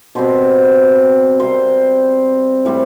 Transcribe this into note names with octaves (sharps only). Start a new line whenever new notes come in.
B2 G3 C4 C5
C3 G3 C4 C5
A2 G3 C4